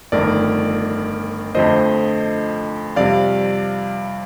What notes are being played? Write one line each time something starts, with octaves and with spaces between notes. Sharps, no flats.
G1 F2 D#3 A3 A#4 D5
F2 D3 F3 A3 C5 D#5
F2 C3 G3 D5 F5